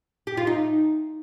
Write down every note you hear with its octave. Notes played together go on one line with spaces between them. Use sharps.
G4
F4
D#4